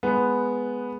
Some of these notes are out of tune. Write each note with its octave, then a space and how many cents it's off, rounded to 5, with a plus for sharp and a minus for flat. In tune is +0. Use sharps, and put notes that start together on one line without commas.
G#3 +0 B3 +0